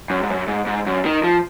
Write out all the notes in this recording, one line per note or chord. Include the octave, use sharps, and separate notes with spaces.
F#2
G#2
F#2
G#2
G#2
F#2
D#3
F3